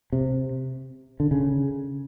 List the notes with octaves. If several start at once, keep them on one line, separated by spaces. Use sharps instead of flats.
C3
D3
C#3